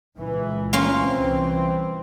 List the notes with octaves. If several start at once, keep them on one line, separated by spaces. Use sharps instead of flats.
C#2 A#2 E3
A#3 C#4 F4
C2 E3 C4